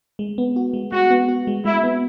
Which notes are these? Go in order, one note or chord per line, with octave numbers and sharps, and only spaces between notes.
G#3
B3
F#4
G#3
G#3 F#4
B3
F#4
G#3
G#3 E4
B3